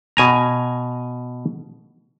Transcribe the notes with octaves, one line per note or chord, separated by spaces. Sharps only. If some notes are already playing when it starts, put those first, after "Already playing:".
B2 G#5 A#5